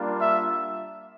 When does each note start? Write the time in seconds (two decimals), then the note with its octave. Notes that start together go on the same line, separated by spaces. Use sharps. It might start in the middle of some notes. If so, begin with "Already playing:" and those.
Already playing: G3 A#3 D4 F4
0.19 E5